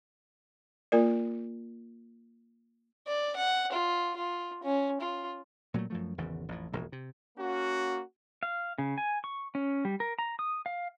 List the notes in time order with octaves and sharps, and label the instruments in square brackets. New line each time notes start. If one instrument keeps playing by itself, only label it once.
[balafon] A#3 F4 A#4 D5
[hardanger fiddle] D5
F#5
F4
F4
C#4
F4
[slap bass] A#2 F#3 G#3 A3
F#2 F3 A3
G#1 E2 G#2 C#3
A1 F2 A2
E1 A#1 F2
C3
[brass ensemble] A#3 C#4 F#4
[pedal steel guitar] F5
C#3
G#5
C#6
C#4
G3
A#4
A#5
D#6
F5